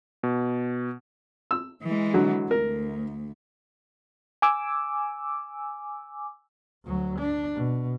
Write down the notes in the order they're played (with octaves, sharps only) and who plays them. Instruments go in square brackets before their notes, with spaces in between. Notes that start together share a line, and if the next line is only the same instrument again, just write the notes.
[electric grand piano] B2
[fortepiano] E6
[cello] E3 G#3
[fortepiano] D3 F#3
[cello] D2 [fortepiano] A#4
[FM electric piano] G#5 D6 E6
[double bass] D2 F#3
D4
B2